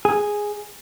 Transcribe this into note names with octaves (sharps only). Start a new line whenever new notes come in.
G#4